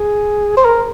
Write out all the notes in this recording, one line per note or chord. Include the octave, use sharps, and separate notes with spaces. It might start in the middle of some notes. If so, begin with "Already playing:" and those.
Already playing: G#4
C5
A#4